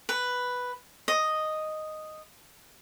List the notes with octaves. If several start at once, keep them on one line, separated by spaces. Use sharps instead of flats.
B4
D#5